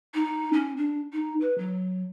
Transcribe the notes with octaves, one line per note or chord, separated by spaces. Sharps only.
D#4
C#4
D4
D#4
B4
F#3